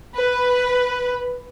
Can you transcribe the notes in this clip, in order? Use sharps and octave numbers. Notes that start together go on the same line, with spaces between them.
B4